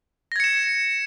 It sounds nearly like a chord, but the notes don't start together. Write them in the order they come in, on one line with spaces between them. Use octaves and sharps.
A#6 G#6 C#7 E7